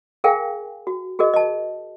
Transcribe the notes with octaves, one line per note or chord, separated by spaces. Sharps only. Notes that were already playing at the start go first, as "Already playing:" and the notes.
G#4 A#4 F5 G5 G#5
F#4
F#4 G#4 A#4 D#5
D#5 A5